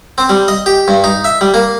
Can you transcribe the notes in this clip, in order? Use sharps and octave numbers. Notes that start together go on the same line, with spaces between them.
C4
G3
D#5
G4
G2
D#4
E5
G3
A#3